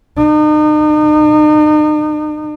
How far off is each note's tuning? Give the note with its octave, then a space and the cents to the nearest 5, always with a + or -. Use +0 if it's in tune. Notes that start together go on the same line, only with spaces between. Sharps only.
D#4 -40